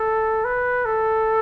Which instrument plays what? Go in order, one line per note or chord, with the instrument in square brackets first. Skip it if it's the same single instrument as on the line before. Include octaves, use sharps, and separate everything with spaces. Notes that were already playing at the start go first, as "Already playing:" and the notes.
Already playing: [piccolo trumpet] A4
B4
A4